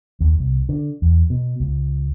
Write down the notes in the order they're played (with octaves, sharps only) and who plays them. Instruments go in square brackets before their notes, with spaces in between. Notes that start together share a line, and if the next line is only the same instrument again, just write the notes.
[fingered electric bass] D#2
C2
D3
E2
B2
C#2